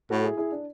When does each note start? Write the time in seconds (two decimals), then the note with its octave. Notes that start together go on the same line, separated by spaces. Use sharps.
0.10 A2 F#4 A4
0.24 E4 G#4
0.37 E4 G#4
0.52 D4